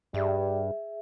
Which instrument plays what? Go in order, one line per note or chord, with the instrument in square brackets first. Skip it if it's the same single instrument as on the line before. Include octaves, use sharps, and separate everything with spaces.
[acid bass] G2 [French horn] G3 [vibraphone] G#4 E5